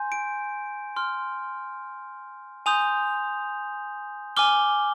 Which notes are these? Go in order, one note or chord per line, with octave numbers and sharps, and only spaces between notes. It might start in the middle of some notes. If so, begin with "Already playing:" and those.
Already playing: G#5 C6 G6
D7
C6 F6
G#5 C6 D#6 G6 F7
G#5 D6 F6 G7